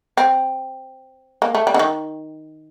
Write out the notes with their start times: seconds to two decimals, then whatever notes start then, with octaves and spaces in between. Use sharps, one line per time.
0.17 C4
1.42 A#3
1.55 A3
1.67 G3
1.74 D3
1.79 D#3